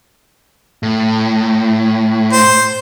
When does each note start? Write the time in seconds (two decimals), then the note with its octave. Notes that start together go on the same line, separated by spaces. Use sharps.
0.83 A2
2.33 C5